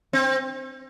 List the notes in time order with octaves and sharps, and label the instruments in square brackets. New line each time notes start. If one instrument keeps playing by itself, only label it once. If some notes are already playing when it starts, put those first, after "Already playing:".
[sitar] C4